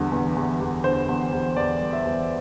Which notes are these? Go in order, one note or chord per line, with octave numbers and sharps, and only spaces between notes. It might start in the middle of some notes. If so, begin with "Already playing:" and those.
Already playing: E2 D3 G3 G4
E2
E2
E2
D3 C5
E2
E2
E2 D5
G3
E5
E2